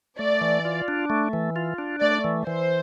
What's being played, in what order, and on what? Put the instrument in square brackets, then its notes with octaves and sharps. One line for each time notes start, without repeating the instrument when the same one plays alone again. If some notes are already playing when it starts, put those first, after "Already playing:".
[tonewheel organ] A3 [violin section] D5
[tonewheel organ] E3
F4
D4
A3
E3
F4
D4
[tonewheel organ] A3 [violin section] D5
[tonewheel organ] E3
[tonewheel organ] E3 [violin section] C5